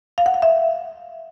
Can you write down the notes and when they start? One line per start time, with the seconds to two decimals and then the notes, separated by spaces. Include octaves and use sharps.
0.18 F5
0.26 F#5
0.34 F5
0.42 E5